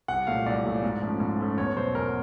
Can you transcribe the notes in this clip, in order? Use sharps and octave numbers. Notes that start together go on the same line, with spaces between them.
C2 F#5
A#2 F#3 A3 F5
C2 D5
A#2 F#3 A3
G#2
F3 A3 C#4
G#2
F3 A3 C#4
E2 C#5
B2 F#3 C5
E2 A#4